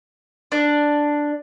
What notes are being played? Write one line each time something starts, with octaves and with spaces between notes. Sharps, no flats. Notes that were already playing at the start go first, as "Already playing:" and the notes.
D4